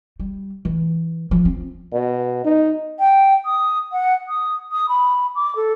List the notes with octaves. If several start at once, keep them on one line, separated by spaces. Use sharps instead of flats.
G3
E3
F3
C4
B2
D#4
G5
D#6
F#5
D#6
D#6
B5
D6
A4